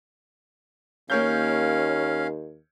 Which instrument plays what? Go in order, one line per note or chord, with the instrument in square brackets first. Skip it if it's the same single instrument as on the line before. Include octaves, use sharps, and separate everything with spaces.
[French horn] D#2 [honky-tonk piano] A#3 C#5 G6 [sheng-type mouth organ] C#4 F5